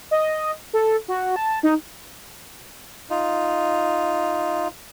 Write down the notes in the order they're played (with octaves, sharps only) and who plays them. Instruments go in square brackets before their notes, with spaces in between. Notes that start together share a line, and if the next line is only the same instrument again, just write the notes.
[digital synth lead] D#5
A4
F#4
A5
D#4
[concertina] D#4 F4